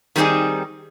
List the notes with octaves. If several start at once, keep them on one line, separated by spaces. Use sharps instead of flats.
D#3 G3 C4 D4 D#4 G#4